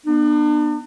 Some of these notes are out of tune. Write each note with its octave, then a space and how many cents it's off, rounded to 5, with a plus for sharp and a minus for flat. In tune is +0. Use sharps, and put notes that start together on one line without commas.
B3 -20 D4 +40